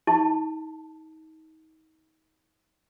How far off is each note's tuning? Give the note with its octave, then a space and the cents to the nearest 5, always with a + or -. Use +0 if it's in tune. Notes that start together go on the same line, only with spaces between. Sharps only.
D#4 +30 A5 +0